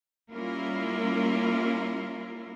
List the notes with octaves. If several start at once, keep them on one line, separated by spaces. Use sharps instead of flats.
G3 A#3 C#4 E4 F4 A#4